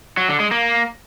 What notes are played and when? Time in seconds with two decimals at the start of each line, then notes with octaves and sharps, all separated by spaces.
0.17 F#3
0.29 D3
0.40 G#3
0.51 A#3